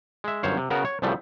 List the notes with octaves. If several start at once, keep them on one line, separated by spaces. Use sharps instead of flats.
G#3 E5
G1 F#2 C5 C#5 F5
C3
C#3 B3 F#4 A#4
C#5
C2 C#3 F3 G3 A3